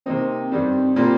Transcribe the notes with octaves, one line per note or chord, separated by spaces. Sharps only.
C3 D#3 A#3 C4 D#4
G2 D#3 G3 D4
A#2 G3 A#3 C4 F4